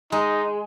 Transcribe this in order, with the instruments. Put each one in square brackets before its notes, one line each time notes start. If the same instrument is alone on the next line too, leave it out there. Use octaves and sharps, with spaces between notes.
[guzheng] G#3 [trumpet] D#4